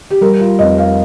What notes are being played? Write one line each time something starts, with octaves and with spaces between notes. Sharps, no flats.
G4
G3 A#4
F4
F1 D#5
F5